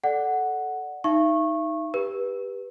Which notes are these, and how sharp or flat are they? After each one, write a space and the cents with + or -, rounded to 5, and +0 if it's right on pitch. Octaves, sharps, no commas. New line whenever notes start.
A4 -10 D5 +0 F#5 +0
D#4 +5 E5 +45 C#6 -20
G4 +15 B4 -15